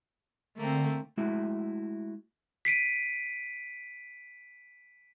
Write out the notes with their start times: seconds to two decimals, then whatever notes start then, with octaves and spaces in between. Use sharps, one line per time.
0.56 D3 A3 A#3 C4
1.17 G#3 A3 E4 F#4 E5
2.65 B6 C7 D7 D#7